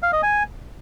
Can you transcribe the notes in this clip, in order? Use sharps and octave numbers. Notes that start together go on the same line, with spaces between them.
F5
D#5
G#5